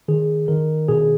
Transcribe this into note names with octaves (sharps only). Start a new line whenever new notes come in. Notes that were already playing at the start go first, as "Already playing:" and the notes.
D#3 G#4
D#3 A#4
B2 G#4